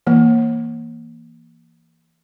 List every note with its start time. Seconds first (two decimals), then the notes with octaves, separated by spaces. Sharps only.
0.07 E3 A#3